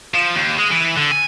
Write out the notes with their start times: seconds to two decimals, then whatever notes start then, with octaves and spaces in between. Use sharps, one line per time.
0.14 F3
0.35 D#2
0.58 G#3
0.71 E3
0.96 D3
1.11 G#5